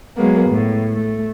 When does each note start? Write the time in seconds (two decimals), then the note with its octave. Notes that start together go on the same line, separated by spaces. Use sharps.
0.16 F#3 G#3 A#3 B3
0.49 A2
0.91 A3